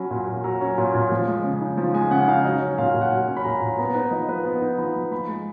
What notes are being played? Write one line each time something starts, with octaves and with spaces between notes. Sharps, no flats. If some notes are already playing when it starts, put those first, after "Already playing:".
Already playing: F#3 C#4 B5
A#2
A#2
F#3 A#5
C#4
A#2
A#2
F3
G#3
C#3
D#4
F3
G#3 G#5
C#3 F#5
D#4 F5
F#3 D#5
C#4
A#2 F5
A#2
F#5
F#3 G#5
C#4
B5
A#2 A#5
A#2
B3 A#5
D#4 B4
F3 D#5
F3 B4
B3
D#4
F3 B5
F3
F3 B5
G#3